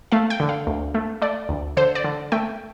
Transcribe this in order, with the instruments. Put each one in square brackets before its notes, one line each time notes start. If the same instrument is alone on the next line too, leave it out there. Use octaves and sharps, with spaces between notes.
[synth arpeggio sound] A3 F5
G5
D3
F5
D2
A3
A3 D5
D2
D3 C5
D5
D3
A3 G5